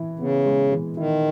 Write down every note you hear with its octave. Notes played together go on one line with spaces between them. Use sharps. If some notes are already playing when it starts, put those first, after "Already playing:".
Already playing: E3 E4
C#3 B3
G#3
E3
D#3 E4